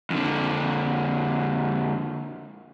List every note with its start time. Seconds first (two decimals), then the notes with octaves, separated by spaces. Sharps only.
0.10 F2 D3